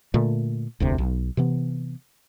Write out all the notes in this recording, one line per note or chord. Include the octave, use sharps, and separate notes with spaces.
A#2 D3 A3
E1 D2 C3
B1
C3 E3 B3